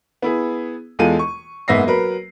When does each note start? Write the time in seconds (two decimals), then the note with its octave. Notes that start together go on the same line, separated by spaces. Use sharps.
0.22 B3 E4 G#4
0.99 E2 G#3 F4 A4 D#7
1.19 C#6
1.68 F#1 G#2 B3 E5 A#6 C7
1.87 F#3 A#4 B4